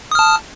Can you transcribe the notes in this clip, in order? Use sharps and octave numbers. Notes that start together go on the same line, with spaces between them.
A5 D#6 F6